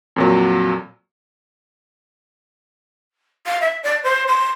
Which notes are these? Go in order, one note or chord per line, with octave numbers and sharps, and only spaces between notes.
F2 A#2 F#3
F5
E5
D5
C5
C6